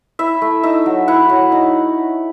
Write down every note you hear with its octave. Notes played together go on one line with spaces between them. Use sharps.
E4 E5
A3
D#4 E5
F#3
E4 F#5
F#3
D#4